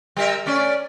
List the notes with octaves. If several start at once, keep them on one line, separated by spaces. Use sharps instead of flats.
G3 A#4 E5
A3 C#4 D5